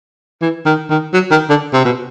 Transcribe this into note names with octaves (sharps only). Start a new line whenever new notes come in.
E3
D#3
D#3
F#3
D#3
D3
C3
B2